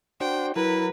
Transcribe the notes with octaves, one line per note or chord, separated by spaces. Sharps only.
D4 F#4 C5 G5
F#3 E4 A#4 B4